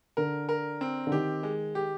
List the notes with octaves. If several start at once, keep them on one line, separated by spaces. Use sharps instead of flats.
D3 A#4
A#4
C4
D3
D#3 G4
G#3
G4